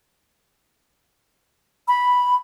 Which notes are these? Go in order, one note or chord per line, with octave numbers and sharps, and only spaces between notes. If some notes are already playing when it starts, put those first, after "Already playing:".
B5